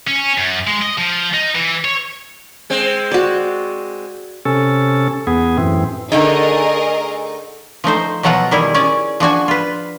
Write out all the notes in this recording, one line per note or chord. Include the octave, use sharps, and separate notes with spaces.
C#4
F#2
G#3
D#5
F3
D#4
E3
C#5
G#3 C4
F#4 D5
C3 C#4 A4
E2 B3 G#4
F#2 A2 E3 C4
D3 A3 D#4 G#4 A#4 D#5
F3 A3 D#4 C5
B2 F3 F#3 F4 F#5 A#5
D#3 G3 E4 G#4
C#4 C#5 D5
F3 D4 F#4 G#5
F4 B4